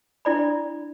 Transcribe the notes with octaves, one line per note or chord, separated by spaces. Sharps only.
D4 E4 D5 B5